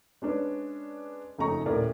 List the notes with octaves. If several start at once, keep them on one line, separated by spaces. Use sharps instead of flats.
G#3 C#4 D4 B4 D5
F#1 F2 A3 D#4 A#5 C#6
D#1 A2 A4 A#4 D5